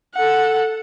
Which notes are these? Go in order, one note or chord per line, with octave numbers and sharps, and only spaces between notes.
A4 F#5